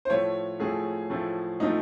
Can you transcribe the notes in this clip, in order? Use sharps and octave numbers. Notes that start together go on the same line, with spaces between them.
C5
A2 F3 A3 C#5
A2 F3 A3 G#4
A2 F3 A3
A2 F3 A3 D#4